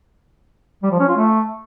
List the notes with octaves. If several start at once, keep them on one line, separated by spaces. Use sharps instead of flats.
G3
F3
C#4
F4
A3